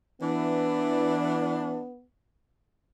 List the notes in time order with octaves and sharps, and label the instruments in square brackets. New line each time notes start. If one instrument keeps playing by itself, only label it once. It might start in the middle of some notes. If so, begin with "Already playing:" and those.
[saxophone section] E3 D4 [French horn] B3